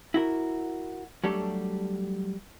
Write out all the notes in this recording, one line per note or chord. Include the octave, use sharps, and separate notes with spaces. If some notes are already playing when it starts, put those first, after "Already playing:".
E4 F#4 A#4
F#3 G3 A3 D4 G4 A4